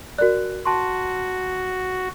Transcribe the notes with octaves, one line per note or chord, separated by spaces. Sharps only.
F#4 A#4 D5 F#6
F#4 A5 C6